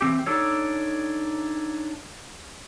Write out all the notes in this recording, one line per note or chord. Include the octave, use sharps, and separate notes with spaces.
E3 C4 G4
D4 D#4 G4 A4 C#5